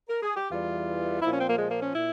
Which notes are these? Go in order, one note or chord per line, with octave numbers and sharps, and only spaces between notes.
A#4
G#4
G4
E2 E3 G3 F4
A#2 F3 E4
C#4
C4
A#3
G#3
A#3
C#4
A#2 E4